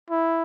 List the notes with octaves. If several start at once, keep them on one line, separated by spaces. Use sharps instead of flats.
E4